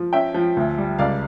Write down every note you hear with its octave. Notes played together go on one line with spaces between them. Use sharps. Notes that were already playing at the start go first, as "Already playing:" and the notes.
Already playing: F3
C#4 E5 G5
F3
D2
G3
C#2 D5 F5